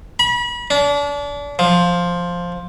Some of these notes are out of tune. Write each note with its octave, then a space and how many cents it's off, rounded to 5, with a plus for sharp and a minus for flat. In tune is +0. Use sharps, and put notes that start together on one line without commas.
B5 -35
D4 -35
F3 +5